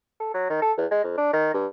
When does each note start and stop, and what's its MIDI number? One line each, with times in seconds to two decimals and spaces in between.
0.20 0.33 69
0.34 0.48 54
0.50 0.61 51
0.62 0.73 69
0.77 0.86 40
0.91 1.03 56
1.04 1.16 41
1.18 1.32 62
1.33 1.50 51
1.54 1.67 43